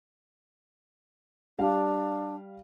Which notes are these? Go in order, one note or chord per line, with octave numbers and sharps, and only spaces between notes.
G3 D4 F5